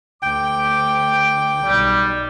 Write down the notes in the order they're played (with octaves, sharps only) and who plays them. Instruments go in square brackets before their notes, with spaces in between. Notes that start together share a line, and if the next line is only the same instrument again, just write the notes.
[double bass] D2 [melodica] G5 [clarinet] D6
[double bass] B1 [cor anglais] G3